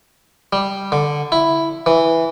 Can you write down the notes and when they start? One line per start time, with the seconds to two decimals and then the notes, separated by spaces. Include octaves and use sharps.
0.53 G3
0.92 D3
1.32 E4
1.86 E3